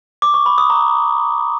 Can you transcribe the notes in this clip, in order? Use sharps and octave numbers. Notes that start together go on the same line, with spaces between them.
D6
C#6
B5
D#6
A#5